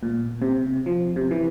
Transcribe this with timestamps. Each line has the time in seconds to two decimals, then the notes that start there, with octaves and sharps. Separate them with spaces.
0.03 A#2
0.42 C3
0.86 F3
1.16 C3
1.31 E3